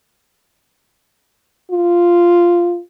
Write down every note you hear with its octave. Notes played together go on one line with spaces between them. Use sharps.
F4